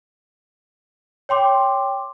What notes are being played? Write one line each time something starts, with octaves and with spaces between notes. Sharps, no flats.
C#5 G5 C6 D6